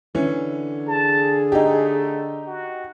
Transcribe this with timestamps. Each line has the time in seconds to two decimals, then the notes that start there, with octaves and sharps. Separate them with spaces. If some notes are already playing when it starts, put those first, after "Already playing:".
0.15 D3 E3 C#4
0.87 G#4 A5
1.52 A3 D#4 G4
2.46 F#4